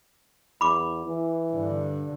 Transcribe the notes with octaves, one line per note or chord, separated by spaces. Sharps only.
E2 B5 D6
E3
G2 D3